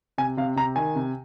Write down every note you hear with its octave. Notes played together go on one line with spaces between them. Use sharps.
C3 G#5
C3 F5
C3 A#5
D#3 G#5
C3